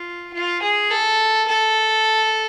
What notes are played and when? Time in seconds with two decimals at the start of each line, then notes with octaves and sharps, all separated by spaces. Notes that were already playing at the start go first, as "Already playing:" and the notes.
Already playing: F4
0.34 F4
0.63 G#4
0.91 A4
1.48 A4